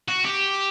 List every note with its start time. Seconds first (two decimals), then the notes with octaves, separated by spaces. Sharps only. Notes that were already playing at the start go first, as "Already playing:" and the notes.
0.08 F#4
0.25 G4